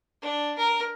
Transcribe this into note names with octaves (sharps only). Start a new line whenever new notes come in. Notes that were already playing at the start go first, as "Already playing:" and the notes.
D4
A#4